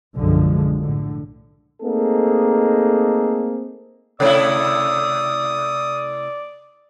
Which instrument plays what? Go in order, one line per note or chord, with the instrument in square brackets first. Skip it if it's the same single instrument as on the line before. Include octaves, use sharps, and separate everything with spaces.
[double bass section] B1 F#2 D3 F3 G#3
A2 D3
[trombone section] A3 A#3 C4 D#4 G#4 A4
[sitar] C3 A3 E4 [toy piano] A4 C#5 [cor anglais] D5 [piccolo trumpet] D#6